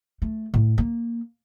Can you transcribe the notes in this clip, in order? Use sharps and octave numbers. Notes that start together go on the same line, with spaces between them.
A3
A2
A#3